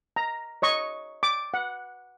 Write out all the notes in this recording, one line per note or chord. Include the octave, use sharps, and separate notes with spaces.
A#5
C#5 D#5 C#6
D6
F#5